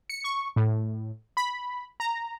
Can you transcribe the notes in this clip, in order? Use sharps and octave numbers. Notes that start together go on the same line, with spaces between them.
C#7
C#6
A2
B5
A#5